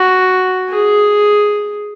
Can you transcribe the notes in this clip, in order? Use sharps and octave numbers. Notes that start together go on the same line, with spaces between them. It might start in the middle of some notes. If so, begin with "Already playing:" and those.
Already playing: F#4
G#4